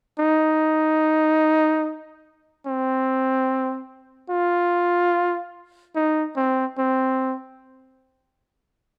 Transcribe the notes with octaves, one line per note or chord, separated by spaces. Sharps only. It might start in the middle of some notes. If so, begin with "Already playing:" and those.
D#4
C4
F4
D#4
C4
C4